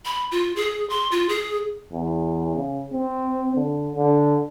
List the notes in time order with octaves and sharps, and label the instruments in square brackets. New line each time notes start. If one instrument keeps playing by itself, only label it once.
[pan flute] B5
F4
G#4
C6
F4
G#4
[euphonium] E2
C#3
C4
D3
D3